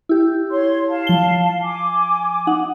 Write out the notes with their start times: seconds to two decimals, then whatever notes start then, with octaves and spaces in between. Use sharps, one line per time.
0.09 E4 G4
0.50 C#5 C6
0.88 F5 A5
1.07 F3 G7
1.62 G#5 D6
2.47 D#4 F#5